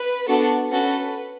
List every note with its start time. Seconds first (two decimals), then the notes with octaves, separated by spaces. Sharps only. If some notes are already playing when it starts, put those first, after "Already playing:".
Already playing: B4
0.28 B3 D4 F#4 A4
0.71 C#4 F#4 A4 B4